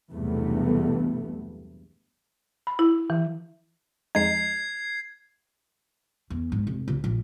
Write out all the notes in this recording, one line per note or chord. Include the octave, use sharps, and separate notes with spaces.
B1 E2 G2 C3 A3 B3
B5
E4
E3
F2 G#3 D#4 G#6 C7
E2
G#2
F1
C#2
A#1